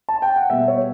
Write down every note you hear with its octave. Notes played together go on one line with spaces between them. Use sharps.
A5
G5
F#5
B2 G3 B3 E5
C#5